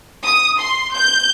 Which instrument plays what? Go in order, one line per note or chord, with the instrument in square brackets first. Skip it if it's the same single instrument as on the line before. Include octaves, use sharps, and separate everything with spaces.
[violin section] D#6
C6
G6